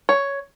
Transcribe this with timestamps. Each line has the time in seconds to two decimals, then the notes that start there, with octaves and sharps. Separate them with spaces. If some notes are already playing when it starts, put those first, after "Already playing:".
0.09 C#5